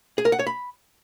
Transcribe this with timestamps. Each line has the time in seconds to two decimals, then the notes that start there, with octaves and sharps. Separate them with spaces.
0.18 G#4
0.25 A#4
0.32 F#5
0.39 C#5
0.47 B5